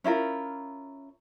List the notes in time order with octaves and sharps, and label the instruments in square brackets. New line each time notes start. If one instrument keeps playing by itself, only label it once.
[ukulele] C#4 E4 F4 A#4